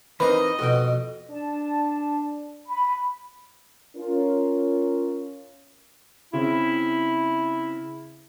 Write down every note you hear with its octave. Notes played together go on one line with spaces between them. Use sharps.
E3 C4 D#4 A#4 B4 D#5 A#5
F2 B2 F#4 G5
D4 A5
B5
C#4 F4 A#4
C#3 C4 E4